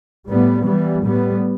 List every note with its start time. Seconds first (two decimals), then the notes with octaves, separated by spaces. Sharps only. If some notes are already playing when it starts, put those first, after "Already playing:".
0.28 A2 G3 B3
0.66 E3 G3 B3
1.03 A2 G3 B3